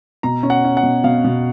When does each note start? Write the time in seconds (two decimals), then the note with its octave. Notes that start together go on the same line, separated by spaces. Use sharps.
0.23 B2 A#5
0.43 C#4
0.50 F#5
0.64 C#4
0.77 F#5
0.83 B2
1.04 B2 F5
1.25 B2